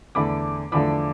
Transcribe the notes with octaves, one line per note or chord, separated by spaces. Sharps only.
E2 D3 A3 B5 D6
E2 D3 F3 A3 B5 D6